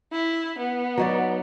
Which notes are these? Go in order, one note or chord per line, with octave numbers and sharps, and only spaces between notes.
E4
B3
F#3 D#4 D5